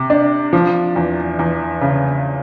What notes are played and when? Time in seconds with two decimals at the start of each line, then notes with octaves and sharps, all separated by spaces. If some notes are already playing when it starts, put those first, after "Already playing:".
Already playing: C3
0.10 D4
0.53 F3
0.96 E2
1.39 E2
1.81 C#3